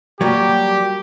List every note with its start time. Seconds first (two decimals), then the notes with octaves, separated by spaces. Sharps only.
0.21 F#3 G3 A#3 G4